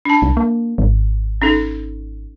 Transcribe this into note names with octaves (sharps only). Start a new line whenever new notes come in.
D4 A5
C2
A#3
G#1
C#4 D#4 A4